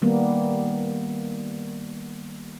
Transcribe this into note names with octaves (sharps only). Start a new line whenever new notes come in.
D#3 G3 A#3 B3